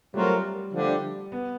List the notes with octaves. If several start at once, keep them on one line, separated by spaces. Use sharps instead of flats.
F#3 G3 A3 C4 F4 A#4
D3 F3 A3 D4 G4
B3